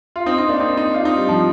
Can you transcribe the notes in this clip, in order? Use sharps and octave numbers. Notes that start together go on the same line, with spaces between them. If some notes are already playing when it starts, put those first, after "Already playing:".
F4
C4 D#4
C4 D#4
A#3 D4
C4 D#4
C4 D#4
D4 F4
C4 D#4
G3
F3